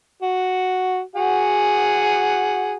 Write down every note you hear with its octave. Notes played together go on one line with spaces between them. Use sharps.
F#4
F#4 G#4 F#5